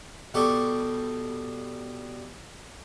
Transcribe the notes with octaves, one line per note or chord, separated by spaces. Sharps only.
B2 G3 G4 A4 C#6